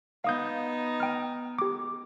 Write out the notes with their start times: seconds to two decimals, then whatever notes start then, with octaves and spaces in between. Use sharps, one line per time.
0.24 B3 D#4 F5 D#6 G6
1.00 G5 F6
1.59 G4 D6